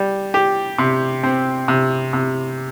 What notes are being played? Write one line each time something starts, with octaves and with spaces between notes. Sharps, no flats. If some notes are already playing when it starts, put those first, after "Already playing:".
Already playing: G3
G4
C3
C4
C3
C3